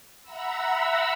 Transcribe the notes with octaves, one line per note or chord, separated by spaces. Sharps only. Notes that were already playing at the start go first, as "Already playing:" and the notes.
E5 F#5 A#5 B5 E6